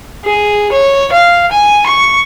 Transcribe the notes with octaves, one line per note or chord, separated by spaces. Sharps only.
G#4
C#5
F5
G#5
C#6